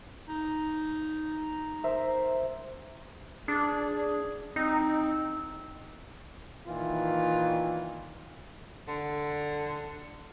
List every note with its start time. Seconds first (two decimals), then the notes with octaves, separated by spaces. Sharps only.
0.28 D#4
1.84 A#4 C5 E5
3.48 D4 G#4
4.56 C4 D#4
6.67 A#2 D#3 E3 F4
8.88 D3